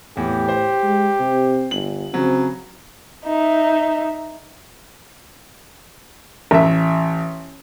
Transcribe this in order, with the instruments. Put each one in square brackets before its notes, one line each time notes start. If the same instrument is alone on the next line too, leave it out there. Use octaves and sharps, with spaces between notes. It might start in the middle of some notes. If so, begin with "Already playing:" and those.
[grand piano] E2 [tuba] A2 [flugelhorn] G4
[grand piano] C5
[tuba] G#3
C3
[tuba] G1 [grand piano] F#7
[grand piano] C#3 F#3 [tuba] C4
[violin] D#4 E5
[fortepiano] A1 E5